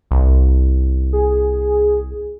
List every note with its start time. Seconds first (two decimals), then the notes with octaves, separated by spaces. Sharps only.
0.11 C2
1.13 G#4